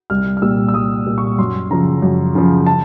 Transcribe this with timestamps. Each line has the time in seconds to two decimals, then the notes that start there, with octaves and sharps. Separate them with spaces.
0.10 C2 F6
0.37 F6
0.42 A#2 G3 E6
0.68 E6
0.74 C2 D#6
1.06 A#2 G3
1.18 C#6
1.38 F#2 C6
1.70 C#3 F3 A#5
2.02 F#2
2.35 C#3 F3
2.66 A5